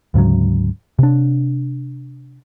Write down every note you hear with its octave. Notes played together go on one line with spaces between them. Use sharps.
D2 G#2 C#3 F#3
C3 D4